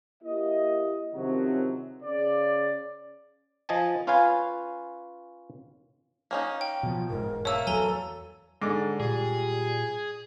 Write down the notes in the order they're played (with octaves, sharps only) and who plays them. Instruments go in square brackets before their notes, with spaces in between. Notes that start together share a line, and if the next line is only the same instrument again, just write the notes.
[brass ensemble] A#3 E4 G4 D#5
F#2 C3 D#3 F3 F#3
C#3 D5
[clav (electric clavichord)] F3 D#5 G#5 A5
C#4 F4 B4 F5 G#5
[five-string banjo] A#3 C#4 D#4
[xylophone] G5
[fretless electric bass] B2 F3
[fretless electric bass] E1 G#2 [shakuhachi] A#4
[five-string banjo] A3 A#3 [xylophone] C#5 E6
[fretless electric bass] E2 F#3 [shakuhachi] A4 [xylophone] G#5 A#5 G7
[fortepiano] G#2 D6 [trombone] D3
[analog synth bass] A#2 [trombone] G3 [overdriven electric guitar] G#4